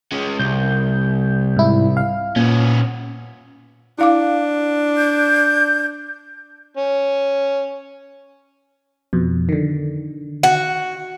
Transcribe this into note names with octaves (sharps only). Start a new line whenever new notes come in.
G#3 C#4
C2 G6
G#2 E4
F5
A#2 B3 C#4
D4 E4 F5 D6
G6
C#4
F2 B2
D3 D#3
F#4